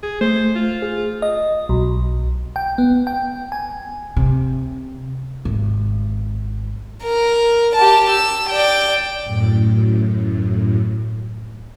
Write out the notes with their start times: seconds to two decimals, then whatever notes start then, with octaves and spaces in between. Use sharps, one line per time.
0.03 G#4
0.21 A3 C5
0.55 F4
0.82 G#4
1.22 D#5
1.69 B1
2.56 G5
2.78 B3
3.07 G5
3.52 G#5
4.16 C3
5.45 G#1
7.03 A#4
7.76 G4 A5
8.10 E6
8.50 D5 G5
9.24 F#2 A2